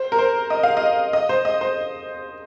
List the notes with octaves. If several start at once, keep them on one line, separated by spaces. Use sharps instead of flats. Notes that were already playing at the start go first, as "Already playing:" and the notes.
Already playing: C5
A#4
C5
D#5
F5
D#5
D#5
C5
D#5
C5